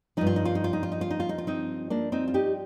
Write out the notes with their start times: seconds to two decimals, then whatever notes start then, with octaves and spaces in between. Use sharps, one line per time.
0.17 G2 F3 D#4
0.27 F4
0.36 D#4
0.45 F4
0.55 D#4
0.64 F4
0.73 D#4
0.83 F4
0.92 D#4
1.01 F4
1.11 D#4
1.20 F4
1.29 D#4
1.38 F4
1.47 C4 D#4
1.90 A#3 D4
2.12 C4 D#4
2.28 F4
2.34 D#4 G4